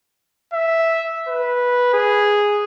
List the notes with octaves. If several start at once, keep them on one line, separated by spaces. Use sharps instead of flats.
E5
B4
G#4